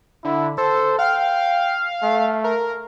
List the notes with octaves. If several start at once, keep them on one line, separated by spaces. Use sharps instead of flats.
D3 E4
A4 C5
F5 G5
A3
A#4